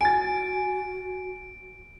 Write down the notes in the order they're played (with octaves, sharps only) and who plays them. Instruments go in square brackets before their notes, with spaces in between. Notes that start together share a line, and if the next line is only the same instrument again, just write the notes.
[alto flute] F#4 [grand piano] G#5 A6 [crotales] D7